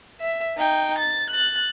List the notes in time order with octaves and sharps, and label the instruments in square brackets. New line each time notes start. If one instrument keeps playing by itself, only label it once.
[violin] E5
D#4 G5
A6
F#6 A6